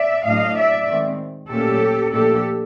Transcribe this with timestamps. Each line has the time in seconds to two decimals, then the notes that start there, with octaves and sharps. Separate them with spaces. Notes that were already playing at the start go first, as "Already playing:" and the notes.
Already playing: D5 E5
0.25 A2 F#3 A3 D4 D#5 F5
0.56 D5 E5
0.87 D#3 G#3 C4
1.49 A#2 F#3 A3 C#4 G4 A4
2.12 A#2 F3 A3 D4 G4 A4